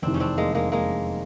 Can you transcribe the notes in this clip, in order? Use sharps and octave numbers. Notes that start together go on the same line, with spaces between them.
F1 E2 C3 D#3 C4 D4
C#4
C4 D4
G#3 A#3
G#3 A#3
G#3 A#3